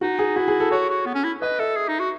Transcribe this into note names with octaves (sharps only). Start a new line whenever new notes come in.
D#4 F#4
G#4
E4 F#4
G#4
A4
F#4 C#5
F#4
B3
C#4
E4
B4 D#5
A4 E5
G#4
D#4
F#4